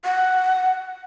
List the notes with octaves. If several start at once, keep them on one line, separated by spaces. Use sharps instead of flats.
F#5